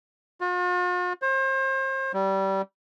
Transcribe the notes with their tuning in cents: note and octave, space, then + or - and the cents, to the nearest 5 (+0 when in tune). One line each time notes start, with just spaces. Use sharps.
F4 +45
C5 +35
G3 -20